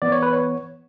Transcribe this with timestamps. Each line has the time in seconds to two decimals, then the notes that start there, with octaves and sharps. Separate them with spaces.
0.02 E3 B3 D5
0.12 C#5
0.23 B4
0.33 C#5